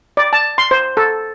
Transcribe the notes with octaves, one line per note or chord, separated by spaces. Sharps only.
D5
A5
C6
C5
A4